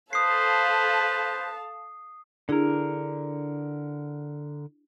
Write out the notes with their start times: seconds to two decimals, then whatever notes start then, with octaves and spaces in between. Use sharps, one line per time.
0.13 A4 B4 C5 F5 A5 D#6 C7
2.49 D3 D4 E4 G#4 A#4